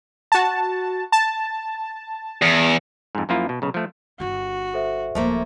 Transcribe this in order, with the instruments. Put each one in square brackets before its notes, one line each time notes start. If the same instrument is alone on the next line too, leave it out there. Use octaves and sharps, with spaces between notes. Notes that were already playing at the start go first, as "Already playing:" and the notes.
[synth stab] F#4 A5
A5
[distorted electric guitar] E2
[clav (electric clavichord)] F2 G#2
F#2 F3 A#3 E4 F4
B2
B1 C#3
F3 A3
[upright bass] G1 E4 [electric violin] F#4
[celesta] A4 C5 E5
[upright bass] D1 [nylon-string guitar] F3 A3 A#3